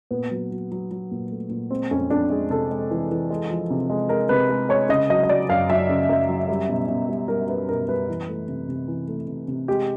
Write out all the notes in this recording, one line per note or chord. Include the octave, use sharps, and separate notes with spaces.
A#2 B3
F#3
F#3
F#3
F#3
A#2
A3
A#2
G#3 C4
F2 C#4
F2 D4
G#3 G#4
C3 A4
G#3
E3
E3
G#3
F3
C3
G#3
G#3 A#4
C3 B4
G#3
G#3 C#5
C#3 D#5
F#3 D#5
D#5
F#3 D5
F#2 F5
F#3 E5
C#3
F#2
F#3
G3
B2
B2
G3
G3 A#4
G3 B4
B2 A#4
G3 B4
E3
A3
C3
C3
E3
A3
C3
C3
G#3 G4